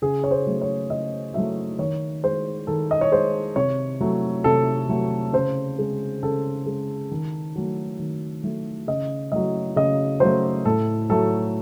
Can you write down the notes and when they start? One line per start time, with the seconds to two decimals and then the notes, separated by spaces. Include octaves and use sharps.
0.02 C#3 G#4
0.24 C#5
0.31 C5
0.46 F#3 A3
0.62 C#5
0.90 C#3 D#5
1.34 F#3 A3 E5
1.79 D#3 C#5
2.24 G#3 C5
2.67 D#3 A4
2.91 D#5
3.01 C#5
3.12 G#3 C5
3.56 C3 C#5
4.01 F#3 A3
4.44 C3 A4
4.89 F#3 A3
5.33 C#3 C5
5.78 G#3
6.23 C#3 A4
6.66 G#3
7.11 D#3
7.56 F#3 A3
7.99 D#3
8.43 F#3 A3
8.87 C#3 D#5
9.32 F#3 A3 D#5
9.76 C#3 D#5
10.20 F#3 A3 C5
10.65 A2 A4
11.10 F#3 A3 A4